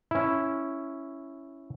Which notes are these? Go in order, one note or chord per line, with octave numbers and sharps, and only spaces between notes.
C#4 E4